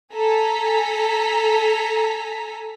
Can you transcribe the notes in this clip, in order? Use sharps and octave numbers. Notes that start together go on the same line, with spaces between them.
A4 G#5 A#5 B6